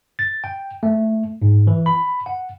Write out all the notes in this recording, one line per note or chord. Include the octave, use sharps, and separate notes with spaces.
A6
G5
A3
G#2
E3
B5
F#5